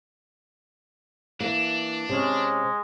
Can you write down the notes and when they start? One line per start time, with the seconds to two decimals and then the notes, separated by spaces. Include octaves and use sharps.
1.40 E3 A#3 D4
2.09 C3 G#3 C#4